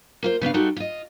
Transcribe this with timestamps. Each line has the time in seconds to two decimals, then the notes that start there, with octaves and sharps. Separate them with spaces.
0.23 A#3 F4 C5
0.41 C#3 B3 D4 F5
0.54 G3 D#4 F4 F#4 A4
0.76 F4 D#5